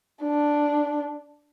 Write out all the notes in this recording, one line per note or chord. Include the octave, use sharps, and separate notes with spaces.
D4